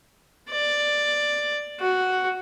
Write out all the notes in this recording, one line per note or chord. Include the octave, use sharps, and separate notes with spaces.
D5
F#4